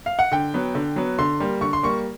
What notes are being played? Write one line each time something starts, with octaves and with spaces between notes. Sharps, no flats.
F5
F#5
D3 G5
F#3 B3
D3
F#3 B3
D3 C6
G3 A#3
D3 C#6
C6
G3 A#3 C#6